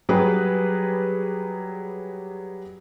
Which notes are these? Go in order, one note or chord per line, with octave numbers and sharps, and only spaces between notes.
F#3 G3 G4 G#4 B4